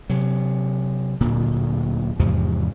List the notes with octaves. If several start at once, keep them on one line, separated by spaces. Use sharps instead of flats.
C3 F#3
D1 A#2 D3
E2 G#2 C3 F3